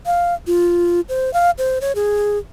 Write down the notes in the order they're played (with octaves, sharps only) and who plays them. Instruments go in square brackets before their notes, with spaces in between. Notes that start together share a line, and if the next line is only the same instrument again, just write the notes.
[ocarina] F5
F4
C5
F5
C5
C#5
G#4